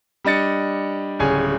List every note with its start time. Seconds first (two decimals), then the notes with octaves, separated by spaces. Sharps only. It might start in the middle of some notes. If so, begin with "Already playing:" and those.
0.25 G3 D4 D#5 A6 C#7
1.19 D1 C#3 G3 G#4 C#5 G#5